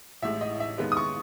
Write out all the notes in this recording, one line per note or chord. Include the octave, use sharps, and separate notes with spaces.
A1 A2 G#3 E5
D#5
E5
D#2 D#3 G#3 B3
D#6
C#6